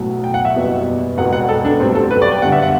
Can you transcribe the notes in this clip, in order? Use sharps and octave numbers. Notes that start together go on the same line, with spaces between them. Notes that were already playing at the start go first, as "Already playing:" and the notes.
Already playing: B1 A2 F#3
G5
F#5
E5
F#1 E2 B2 G3
E1 E2 B2 F#5
F#5
A4
D4
A1 G2 F#3 C4
A4
B4
D5
G5
G1 G2 D3 F#5
E5
F#5